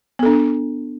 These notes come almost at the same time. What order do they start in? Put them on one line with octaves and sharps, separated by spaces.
B3 A4 D4